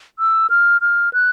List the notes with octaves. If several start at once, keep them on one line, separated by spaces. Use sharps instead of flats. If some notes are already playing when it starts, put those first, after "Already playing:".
E6
F6
F6
F#6